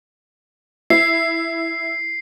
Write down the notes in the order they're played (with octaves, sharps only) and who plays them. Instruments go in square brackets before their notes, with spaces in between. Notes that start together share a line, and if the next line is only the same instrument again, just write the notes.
[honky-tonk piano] E4 [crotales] C7